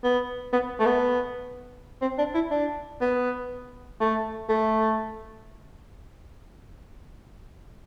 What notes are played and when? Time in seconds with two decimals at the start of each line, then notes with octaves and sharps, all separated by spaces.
0.04 B3
0.53 B3
0.80 A3
0.86 B3
2.01 C4
2.18 D4
2.34 E4
2.51 D4
3.01 B3
4.00 A3
4.49 A3